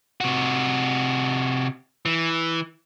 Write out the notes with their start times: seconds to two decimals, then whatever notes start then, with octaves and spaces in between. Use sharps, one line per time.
0.21 C3 F#4
2.06 E3